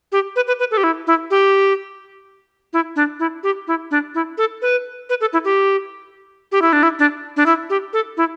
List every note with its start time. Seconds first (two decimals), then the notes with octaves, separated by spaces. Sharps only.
0.12 G4
0.36 B4
0.47 B4
0.59 B4
0.71 A4
0.77 G4
0.84 E4
1.07 E4
1.31 G4
2.73 E4
2.96 D4
3.19 E4
3.43 G4
3.67 E4
3.91 D4
4.15 E4
4.38 A4
4.62 B4
5.09 B4
5.21 A4
5.33 E4
5.45 G4
6.52 G4
6.62 E4
6.73 D4
6.83 E4
6.99 D4
7.37 D4
7.46 E4
7.70 G4
7.93 A4
8.17 E4